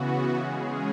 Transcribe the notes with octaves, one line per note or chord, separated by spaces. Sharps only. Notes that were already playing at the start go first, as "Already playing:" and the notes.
Already playing: C#3 E3 B3 F#4
C#3 G#3 C#4 G#4